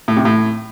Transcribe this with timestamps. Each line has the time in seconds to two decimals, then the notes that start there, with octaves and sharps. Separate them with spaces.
0.08 A2
0.17 C3
0.25 A2